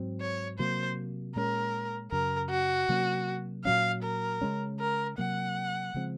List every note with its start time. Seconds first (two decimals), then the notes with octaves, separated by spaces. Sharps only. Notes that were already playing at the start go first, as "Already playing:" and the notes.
Already playing: G#2 F#3 C4
0.21 C#5
0.59 C3 F#3 A#3 C5
1.36 A#2 G#3 C#4 A#4
2.12 F#2 C#3 F#3 A#4
2.50 F#4
2.89 C3 F#3 A#3 C#4
3.65 A#2 F#3 C#4 F5
4.03 A#4
4.41 C#3 G#3 C#4
4.80 A#4
5.18 C3 F#3 A#3 F#5
5.94 C#3 F3 G#3 C4